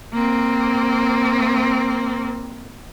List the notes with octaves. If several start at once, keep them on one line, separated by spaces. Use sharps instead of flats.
A#3 C4